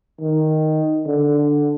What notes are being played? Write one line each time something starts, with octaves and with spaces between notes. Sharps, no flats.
D#3
D3